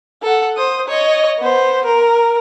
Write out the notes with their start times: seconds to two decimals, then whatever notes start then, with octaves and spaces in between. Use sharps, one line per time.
0.22 A4 F#5
0.57 C5 D#6
0.88 C#5 D#5
1.39 B3 C5
1.85 A#4